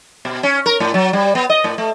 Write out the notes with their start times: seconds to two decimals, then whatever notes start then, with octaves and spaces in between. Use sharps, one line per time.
0.25 B2
0.43 C#4
0.66 A#4
0.80 A2
0.94 F#3
1.13 G3
1.35 B3
1.50 D#5
1.64 A2
1.78 A3